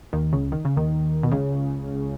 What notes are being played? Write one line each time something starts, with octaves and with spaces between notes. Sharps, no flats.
D#2 D#3
C#2 C#3
D#3
C#3
D#2 D#3
B2
C#2 C#3